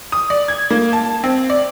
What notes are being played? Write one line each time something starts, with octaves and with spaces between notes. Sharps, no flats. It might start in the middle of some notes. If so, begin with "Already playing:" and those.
D#6
D5
G#6
A#3
A5
C4
D5